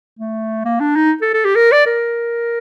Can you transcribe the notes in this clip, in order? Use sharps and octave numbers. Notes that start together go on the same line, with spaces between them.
A3
A#3
D4
D#4
A4
A4
G4
A#4
D5
A#4